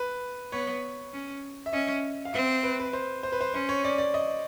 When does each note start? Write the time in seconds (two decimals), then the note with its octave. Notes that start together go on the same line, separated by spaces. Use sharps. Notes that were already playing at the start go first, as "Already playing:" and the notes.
Already playing: B4
0.52 B3 C#5
1.13 C#4
1.66 E5
1.73 C#4 D#5
2.25 F5
2.33 C4 E5
2.63 B4
2.79 B4
2.93 C5
3.23 C5
3.32 B4
3.41 C5
3.53 C#4 C5
3.69 C#5
3.84 D5
3.98 D5
4.14 D#5